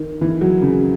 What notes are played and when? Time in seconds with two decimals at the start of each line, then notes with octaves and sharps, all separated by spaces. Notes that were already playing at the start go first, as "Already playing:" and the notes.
Already playing: D#3
0.21 E3
0.41 F#3
0.62 C#3